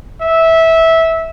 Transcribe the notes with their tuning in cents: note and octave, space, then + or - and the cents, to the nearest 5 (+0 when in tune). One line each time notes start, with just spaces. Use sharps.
E5 -15